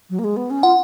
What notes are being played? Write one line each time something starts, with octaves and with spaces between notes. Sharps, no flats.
F#3
A#3
G#3
B3
C#4
F4 F#5